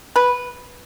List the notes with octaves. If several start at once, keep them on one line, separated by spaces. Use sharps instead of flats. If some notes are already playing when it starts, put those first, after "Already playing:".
B4